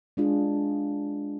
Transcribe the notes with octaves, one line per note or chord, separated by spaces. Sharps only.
G#3 D4 F4 G#4